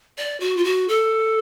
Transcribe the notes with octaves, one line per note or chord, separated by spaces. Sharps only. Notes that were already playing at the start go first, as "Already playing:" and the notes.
D5
F#4
F4
F#4
A4